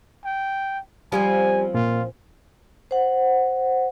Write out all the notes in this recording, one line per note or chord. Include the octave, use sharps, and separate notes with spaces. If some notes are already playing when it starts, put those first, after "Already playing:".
G5
F3 G3 C4 C#4 G#5
A#2 F4
C5 F#5